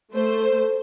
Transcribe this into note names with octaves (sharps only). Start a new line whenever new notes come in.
A3 C5